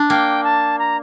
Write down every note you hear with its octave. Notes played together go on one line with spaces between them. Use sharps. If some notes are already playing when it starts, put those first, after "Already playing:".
Already playing: D4
A#3 G5
A5
A#5